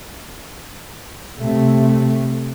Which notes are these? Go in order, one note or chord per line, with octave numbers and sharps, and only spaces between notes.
C3 A3